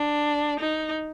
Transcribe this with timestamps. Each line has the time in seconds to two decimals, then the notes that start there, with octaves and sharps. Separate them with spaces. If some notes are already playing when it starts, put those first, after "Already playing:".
Already playing: D4
0.60 D#4